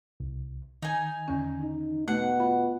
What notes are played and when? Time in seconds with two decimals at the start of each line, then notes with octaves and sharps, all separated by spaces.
0.20 C2
0.82 D#3 D#4 G#5
1.28 E2 D3 C#4
1.62 D#4
2.08 B2 A3 F#5
2.40 F4 B5